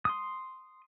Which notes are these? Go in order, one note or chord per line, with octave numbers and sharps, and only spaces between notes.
C6 D#6